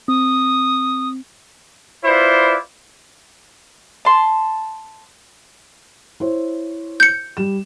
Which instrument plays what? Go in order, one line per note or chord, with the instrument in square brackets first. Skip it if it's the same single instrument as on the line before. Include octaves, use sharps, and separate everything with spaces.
[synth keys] C4 [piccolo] D#6
[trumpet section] E4 F4 B4 C5 D5
[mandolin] A5 C6
[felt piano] E4 C5 C#5
[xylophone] G6 C#7
[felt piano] G3 E7